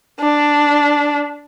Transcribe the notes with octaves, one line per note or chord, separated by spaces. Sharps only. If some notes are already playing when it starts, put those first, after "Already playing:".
D4